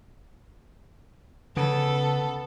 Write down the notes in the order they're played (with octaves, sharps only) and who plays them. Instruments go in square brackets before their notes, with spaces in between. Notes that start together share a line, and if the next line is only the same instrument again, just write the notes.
[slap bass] C#3 [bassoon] B3 [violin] A4